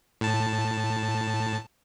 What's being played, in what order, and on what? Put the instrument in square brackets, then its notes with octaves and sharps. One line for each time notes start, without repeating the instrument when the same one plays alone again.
[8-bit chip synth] A2 A5